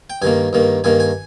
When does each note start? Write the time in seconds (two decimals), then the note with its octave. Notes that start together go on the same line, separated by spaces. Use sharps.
0.10 G5
0.22 G2 D#3 A#3 G#5
0.53 G2 D#3 A#3
0.84 G2 D#3 A#3 G#5
1.00 G#5